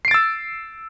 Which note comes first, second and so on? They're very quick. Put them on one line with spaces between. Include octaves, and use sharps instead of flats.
C7 D7 A6 E6